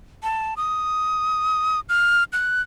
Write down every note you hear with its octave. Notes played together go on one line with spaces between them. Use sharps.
A5
D#6
F6
F#6